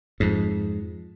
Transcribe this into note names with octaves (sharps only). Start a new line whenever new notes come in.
F2 G#2